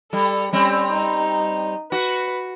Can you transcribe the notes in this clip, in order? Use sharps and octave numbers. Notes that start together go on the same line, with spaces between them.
G3 A4
G3 C4 C#4
D#4
F#4 B4